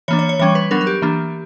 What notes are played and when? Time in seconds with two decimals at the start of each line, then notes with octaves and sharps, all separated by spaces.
0.08 E3 A#3 D4 C#5
0.19 C#5
0.29 C#5
0.39 E3 G3 C#4 C#5
0.55 B4
0.71 F#3 B3 D4 A#4
0.81 A#4
0.87 G4
1.02 E3 A#3 D4